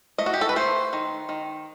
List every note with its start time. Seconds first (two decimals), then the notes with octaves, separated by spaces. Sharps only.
0.18 A3 D#5
0.26 F#4
0.34 G4
0.41 A4
0.49 B4
0.56 A3 C5
0.93 D#3
1.29 D#3